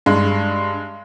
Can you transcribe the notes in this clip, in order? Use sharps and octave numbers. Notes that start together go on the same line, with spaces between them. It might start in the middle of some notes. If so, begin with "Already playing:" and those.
G2 G#3